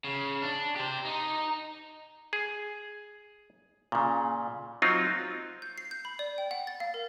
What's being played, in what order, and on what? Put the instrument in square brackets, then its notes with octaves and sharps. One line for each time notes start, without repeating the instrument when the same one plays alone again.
[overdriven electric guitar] C#3
D4
G4 C5
D#4
[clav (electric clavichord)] G#4
A#2 C#3
F#3 C4 D#4 F4
[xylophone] G6
C7
G6
B5
D5
G5
F#5
A6
F5
A#4